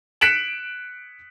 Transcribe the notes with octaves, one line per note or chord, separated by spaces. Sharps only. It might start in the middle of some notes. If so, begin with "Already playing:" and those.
F#6 B6 C#7 D7 E7 F#7